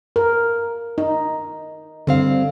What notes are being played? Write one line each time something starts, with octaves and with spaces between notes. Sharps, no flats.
A#4
D#4
G2 D3 C4 F5